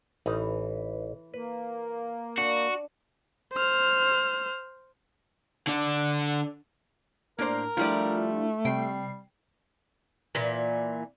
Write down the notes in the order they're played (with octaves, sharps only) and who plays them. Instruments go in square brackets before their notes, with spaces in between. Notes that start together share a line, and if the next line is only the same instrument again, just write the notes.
[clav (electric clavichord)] A1 D#4 [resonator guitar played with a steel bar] E3
[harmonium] A#3 [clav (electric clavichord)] B4
[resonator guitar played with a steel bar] D4 [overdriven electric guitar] F#4
[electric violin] C5 F6
[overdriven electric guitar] D3 D4
[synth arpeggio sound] A2 D4 [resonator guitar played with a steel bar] A#3 C5 [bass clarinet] A#4
[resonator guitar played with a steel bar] F3 G3 D5 [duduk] A3 [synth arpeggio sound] D4 E4 F4
[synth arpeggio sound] C3 C7 [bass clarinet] G3 [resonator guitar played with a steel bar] G5
[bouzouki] A#2 E3